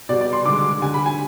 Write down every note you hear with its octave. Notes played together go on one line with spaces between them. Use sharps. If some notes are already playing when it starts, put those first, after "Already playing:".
B2 G3 D5
D5
C6
D3 G#3 D6
D6
D3 G3 G#5
B5
G#5